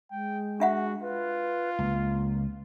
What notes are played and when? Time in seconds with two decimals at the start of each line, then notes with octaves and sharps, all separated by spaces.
0.11 G#3 G5
0.60 D4 F#4 E5 F#5
1.01 F4 B4
1.79 C#2 A#3